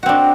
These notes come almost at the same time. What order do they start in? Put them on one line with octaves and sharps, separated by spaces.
F#4 C4 D4